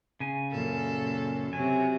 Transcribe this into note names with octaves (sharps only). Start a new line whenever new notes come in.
C#3 G#5
F#2 A#2 A4
C3 F#3 G#5